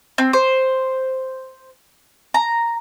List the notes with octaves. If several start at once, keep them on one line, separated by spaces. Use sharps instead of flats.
C4
C5
A#5